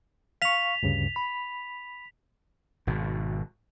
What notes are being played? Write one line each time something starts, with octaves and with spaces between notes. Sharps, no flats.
F5 C#6 B6 F7
D2 G2 C#3
B5
G#1 B2